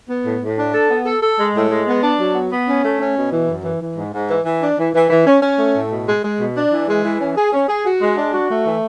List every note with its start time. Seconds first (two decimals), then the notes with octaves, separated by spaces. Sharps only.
0.09 B3
0.25 A2
0.41 A2
0.58 D4
0.73 A4
0.89 B3
1.06 A4
1.21 A4
1.38 G#3
1.55 A2
1.70 G#3
1.87 B3
2.03 D4
2.19 F#3
2.34 B3
2.52 B3
2.68 C#4
2.84 A3
2.99 C#4
3.16 B2
3.32 E3
3.49 F#2
3.64 E3
3.80 E3
3.96 G#2
4.13 G#2
4.28 E3
4.45 E3
4.62 D4
4.78 E3
4.94 E3
5.10 E3
5.26 C#4
5.42 C#4
5.59 A3
5.74 A2
5.90 B2
6.07 G#3
6.23 G#3
6.39 B2
6.56 D4
6.71 E3
6.88 G#3
7.04 E3
7.19 C#4
7.36 G#4
7.53 C#4
7.68 G#4
7.85 F#4
8.01 G#3
8.16 D4
8.33 F#4
8.50 A3
8.66 E3